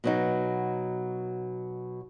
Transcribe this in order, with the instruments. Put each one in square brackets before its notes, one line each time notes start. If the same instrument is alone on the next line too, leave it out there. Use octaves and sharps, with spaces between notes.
[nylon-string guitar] B2 F#3 D#4